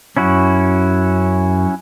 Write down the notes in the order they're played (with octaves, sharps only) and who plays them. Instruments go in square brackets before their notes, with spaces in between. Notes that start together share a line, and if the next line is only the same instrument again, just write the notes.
[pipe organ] F#2 [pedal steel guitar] C#4 E4 F#4